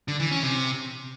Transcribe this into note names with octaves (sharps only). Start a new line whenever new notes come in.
D3
E3
C#4
C3